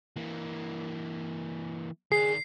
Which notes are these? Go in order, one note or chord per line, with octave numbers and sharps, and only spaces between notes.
E3 A#3
D#3 D4 G#4 C7